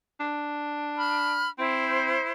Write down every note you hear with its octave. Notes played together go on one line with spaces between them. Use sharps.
D4
B5 F6
C4 E4 C5